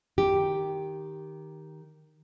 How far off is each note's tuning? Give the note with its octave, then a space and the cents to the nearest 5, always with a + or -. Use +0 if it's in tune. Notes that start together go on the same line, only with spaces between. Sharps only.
D#3 +0 G4 +0